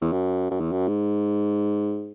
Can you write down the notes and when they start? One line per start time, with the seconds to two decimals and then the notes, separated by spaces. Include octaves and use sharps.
0.02 E2
0.12 F#2
0.51 F#2
0.60 E2
0.72 F#2
0.88 G#2